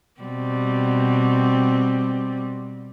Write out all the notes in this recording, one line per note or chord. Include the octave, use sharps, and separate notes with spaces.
B2 G3 C4